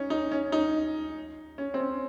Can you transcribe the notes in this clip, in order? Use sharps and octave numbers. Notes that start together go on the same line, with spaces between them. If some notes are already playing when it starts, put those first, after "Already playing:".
Already playing: C#4 D#4
D#4
C#4
D#4
C#4
C4
C#4